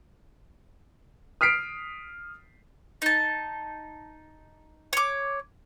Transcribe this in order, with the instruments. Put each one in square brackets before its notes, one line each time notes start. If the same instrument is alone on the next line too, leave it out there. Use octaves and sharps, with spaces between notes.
[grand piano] D#6 F6 B6 C7 D7
[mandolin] D#4 A5
C#5 D6